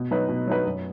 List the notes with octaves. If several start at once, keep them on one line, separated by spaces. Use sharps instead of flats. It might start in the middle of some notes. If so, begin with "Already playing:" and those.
Already playing: B2
F#3 D#4 B4
B2
F#3 D#4 B4
F#2